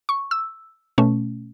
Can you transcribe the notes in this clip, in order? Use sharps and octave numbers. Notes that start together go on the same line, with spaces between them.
C#6
E6
B2 A3 C#4